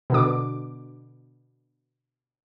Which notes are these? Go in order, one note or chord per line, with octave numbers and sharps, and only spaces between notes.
B2 D3 D6